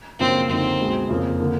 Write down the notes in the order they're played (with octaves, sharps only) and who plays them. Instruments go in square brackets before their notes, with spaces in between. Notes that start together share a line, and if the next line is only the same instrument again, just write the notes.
[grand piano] F#2 C#3 F3 A#3 D4 [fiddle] C4
[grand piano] F#2 D3 F3 A#3 D#4 [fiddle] C4
[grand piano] C#2 B2 G#3
F2 C#3 F3 A#3
D3 F3 A#3